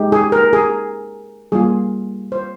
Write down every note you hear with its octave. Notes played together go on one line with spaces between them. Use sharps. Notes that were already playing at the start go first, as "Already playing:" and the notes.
Already playing: G#3 D#4 G4
G#4
A#4
G#4
G3 A#3 F4 G#4
C5